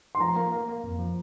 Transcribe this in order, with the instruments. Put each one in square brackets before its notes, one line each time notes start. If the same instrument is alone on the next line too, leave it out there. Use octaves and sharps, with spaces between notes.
[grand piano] C6
[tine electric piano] F3 [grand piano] A#5
[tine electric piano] A#3
A#3
A#3
F2
F3